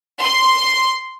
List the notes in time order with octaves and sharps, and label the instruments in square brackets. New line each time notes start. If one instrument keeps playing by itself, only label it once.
[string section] C6